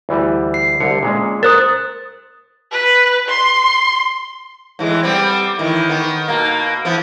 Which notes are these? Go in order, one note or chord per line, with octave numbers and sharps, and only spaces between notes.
D2 E3 G3
C7
C2 D3 C#5 C#7
A#2 G#3 C#4
A#4 C5 D#6 F#6 A6
B4
C6
A2 E3 G#3
G3 B3 C4
A2 D#3 E3
D#3 B3
B2 A#3
E3 F3 B3